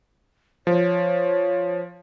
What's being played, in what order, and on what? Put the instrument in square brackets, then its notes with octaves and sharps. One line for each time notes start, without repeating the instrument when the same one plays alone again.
[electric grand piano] F3 [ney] C#5